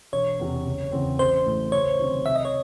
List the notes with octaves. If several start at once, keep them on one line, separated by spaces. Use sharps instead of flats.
E1 C#5
E2 C3
F#1
E2 C#3 E3 C4
A1 C5
A2 E3 A3
C#2 C#5
C3 D#3 F#3 C4
C2 E5
D#5
C#5